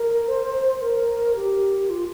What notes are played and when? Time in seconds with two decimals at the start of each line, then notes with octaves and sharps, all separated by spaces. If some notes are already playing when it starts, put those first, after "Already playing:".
Already playing: A#4
0.28 C5
0.82 A#4
1.36 G4
1.90 F4